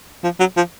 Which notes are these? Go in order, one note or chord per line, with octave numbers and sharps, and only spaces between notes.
F3
F#3
F3